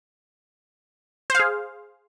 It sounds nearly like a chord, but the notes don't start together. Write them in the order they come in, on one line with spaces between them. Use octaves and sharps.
C5 F5 G#4